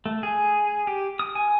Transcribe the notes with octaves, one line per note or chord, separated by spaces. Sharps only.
A3
G#4
G4
D#6
G#5